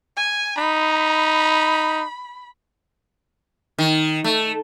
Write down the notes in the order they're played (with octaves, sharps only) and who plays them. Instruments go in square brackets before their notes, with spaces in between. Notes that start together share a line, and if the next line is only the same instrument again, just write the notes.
[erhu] G#5
[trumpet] D#4 [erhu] B5
[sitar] D#3
A3